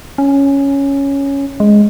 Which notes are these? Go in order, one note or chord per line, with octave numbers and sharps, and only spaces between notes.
C#4
G#3